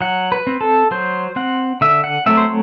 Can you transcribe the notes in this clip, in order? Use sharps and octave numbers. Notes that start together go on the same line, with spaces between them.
F#3 F#5
B4
C4
A4
F#3 C5
C4 F#5
D3 E5
F#5
F#3 A3 C4 E5
C5